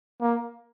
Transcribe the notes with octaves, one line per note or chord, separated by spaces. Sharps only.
A#3